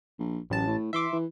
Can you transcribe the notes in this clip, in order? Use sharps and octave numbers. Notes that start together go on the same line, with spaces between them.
A#1
A1 F#2 A5
A2
E3 E5 C6 D6
E3